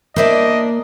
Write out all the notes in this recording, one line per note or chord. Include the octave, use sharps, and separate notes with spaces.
A#3 D4 E4 C5 D5 D#5